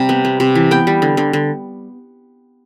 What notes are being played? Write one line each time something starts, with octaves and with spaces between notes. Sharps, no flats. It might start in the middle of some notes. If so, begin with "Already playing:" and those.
Already playing: C3 G3
B3
B3
C3
E3
B3 G5
G3
D3
D3
D3